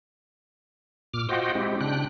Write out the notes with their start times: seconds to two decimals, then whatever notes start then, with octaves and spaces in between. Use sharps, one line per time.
1.14 A#2 D6 F6
1.29 F4 F#4 C5 D#5 F#5 G5
1.55 G#3 C4 E4 G4
1.81 C#3 D4 G5 F#6